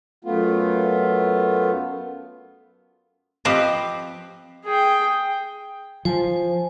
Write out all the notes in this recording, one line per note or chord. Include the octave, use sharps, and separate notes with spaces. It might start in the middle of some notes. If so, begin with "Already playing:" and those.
F#2 A3 B3 F4
F3 C4 G4 B4 C5 D#5
G#4 G5
F3 C5 G#5